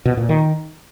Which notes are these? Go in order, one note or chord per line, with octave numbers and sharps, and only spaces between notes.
B2
A#2
D#3